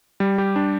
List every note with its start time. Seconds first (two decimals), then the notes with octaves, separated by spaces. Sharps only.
0.20 G3
0.38 G4
0.56 D4